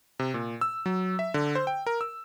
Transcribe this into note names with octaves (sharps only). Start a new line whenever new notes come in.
C3
A#2
E6
F#3
E5
D3
C5
G5
A#4
E6